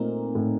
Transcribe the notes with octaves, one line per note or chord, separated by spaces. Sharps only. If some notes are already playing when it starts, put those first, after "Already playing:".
Already playing: A#2 A3 C4 D#4 A#4
A2